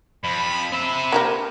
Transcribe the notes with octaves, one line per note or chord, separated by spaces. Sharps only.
F2 B5
C4 E5 B5
A#3 G4 A#4